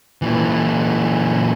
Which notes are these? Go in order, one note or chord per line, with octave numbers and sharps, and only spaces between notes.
A#2 E3